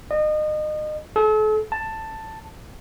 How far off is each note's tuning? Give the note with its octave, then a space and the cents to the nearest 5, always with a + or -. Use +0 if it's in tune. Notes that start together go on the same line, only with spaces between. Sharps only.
D#5 -30
A4 -40
A5 +10